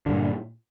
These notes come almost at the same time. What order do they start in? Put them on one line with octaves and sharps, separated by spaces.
D3 G2 A#2